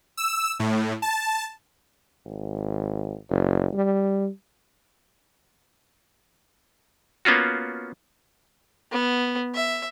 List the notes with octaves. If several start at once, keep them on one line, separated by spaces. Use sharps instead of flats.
E6
A2
A5
G#1
F#1
G3
A#3 B3 C#4 F4 F#4
B3
E5